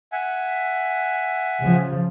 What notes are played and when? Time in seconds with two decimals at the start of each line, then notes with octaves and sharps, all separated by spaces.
0.12 E5 F#5 G#5
1.61 C#3 F3